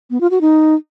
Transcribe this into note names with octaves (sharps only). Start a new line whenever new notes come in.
B3
F4
F#4
D#4